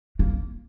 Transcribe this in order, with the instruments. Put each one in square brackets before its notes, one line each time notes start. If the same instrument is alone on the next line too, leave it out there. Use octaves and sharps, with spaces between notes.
[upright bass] A#3